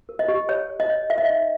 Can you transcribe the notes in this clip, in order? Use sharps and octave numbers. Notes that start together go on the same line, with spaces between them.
A#4
D#5
G4
C#5
C#5
D#5
C#5
A#4 E5
D#5
D#4 E5